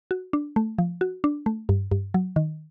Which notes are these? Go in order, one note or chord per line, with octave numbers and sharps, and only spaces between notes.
F#4
D4
A3
F3
F#4
D4
A3
G2
G2
F#3
D#3